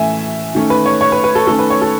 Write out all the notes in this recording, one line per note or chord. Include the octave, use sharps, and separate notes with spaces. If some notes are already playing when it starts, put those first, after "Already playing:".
Already playing: A2 E3 A3 C#4 E5 G#5
D#3 A3 C#4
B4
C#5
C#5
B4
B4
A4
D#3 A3 C#4 A4
B4
C#5
A4